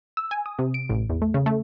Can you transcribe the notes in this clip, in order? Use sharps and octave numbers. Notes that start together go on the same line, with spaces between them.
E6
G#5
D#6
C3
D7
A1
E2
A3
C#3
A3